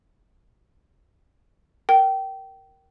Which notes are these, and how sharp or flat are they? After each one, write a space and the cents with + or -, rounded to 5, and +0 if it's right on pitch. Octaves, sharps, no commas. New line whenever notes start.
A#4 +0 G5 -20